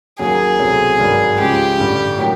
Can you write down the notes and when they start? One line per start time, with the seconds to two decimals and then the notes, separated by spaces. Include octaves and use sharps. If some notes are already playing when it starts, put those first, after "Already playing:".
0.19 D#2 D#3 F#3 A#3 C#4 G#4
0.59 C2 B2 F#3 A3 C4
0.98 G#1 G2 D#3 F#3
1.38 C#2 C#3 F3 G#3 G4
1.77 A1 G2 D3 G3
2.17 A2 F#3 A#3